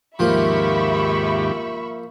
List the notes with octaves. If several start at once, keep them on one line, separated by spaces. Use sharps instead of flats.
D#2 G#2 F3 A#3 G4 E5 B5 C#6